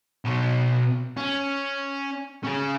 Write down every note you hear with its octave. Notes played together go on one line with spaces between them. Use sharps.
B2 C#5
C#4
C#4 G#4